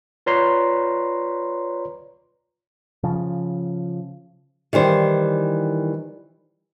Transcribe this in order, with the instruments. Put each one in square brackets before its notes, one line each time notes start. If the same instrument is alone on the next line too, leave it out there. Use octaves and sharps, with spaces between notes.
[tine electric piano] F4 B4 C#5 D5 A#5 C6
[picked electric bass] C#3 F3
[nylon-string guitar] D#3 E3 G3 C5